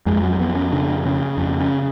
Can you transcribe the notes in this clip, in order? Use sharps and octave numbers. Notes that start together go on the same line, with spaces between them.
F2 G#3
F#3
F2 B3
C#4
C#3 D4
C#3 C#4
F2 C#4
C#4